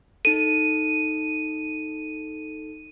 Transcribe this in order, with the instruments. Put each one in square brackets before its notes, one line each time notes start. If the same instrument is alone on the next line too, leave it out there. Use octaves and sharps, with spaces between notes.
[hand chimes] D#4 A4 [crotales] D#7